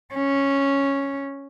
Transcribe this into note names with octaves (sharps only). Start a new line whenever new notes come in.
C#4